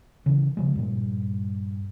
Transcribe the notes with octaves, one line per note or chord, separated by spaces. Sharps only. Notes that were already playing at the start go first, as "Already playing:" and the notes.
C#3 E3
C#3 F3 G#3
G2 A#2